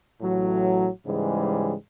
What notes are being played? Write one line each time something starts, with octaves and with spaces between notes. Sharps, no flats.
A1 A2 F#3
G#2 C#3 E3 G3 G#3